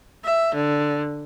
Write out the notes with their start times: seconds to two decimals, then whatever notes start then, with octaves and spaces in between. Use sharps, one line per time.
0.24 E5
0.54 D3